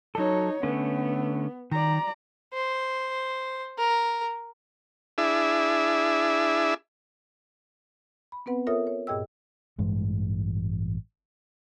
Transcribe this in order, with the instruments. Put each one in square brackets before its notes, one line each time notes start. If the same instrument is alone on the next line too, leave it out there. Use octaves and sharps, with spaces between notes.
[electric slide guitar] F#3 A4 [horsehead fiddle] D#4 C#5
[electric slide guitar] D3 A3 C#4 [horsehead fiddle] B3
[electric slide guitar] D#3 [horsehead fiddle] D5 A#5
[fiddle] C5
A#4
[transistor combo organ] D4 E4 G#4 E5
[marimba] B5
B3 C4 B4 F#5
F4 A4 A#4 C#5 E5 D#6
C#5
G2 A#2 G#4 D#5 G5 E6
[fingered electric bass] A1 G2 E3 G#3